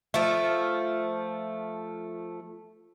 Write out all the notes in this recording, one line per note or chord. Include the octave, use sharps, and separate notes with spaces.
F3 A3